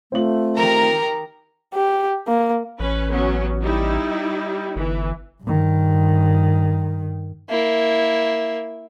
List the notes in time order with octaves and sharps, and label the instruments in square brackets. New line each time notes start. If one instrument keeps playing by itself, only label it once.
[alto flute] A3 [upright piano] C4 F4 F#7
[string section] D#3 G4 A#5 [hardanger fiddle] A#4
[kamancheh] G4
A#3
[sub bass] A1 [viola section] C#4 B4
[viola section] F#3 B3 C#4
G3 D#4 E4
[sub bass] G1 [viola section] E3
[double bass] G2 D#3
[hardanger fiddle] A#3 E4